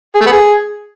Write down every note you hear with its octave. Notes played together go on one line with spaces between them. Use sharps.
G#4
A3
B3
G#4